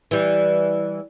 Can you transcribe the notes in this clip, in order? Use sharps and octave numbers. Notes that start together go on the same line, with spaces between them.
E3 G3